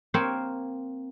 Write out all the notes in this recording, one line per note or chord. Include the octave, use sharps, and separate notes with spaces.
A#3 C4 C5 C#5 F5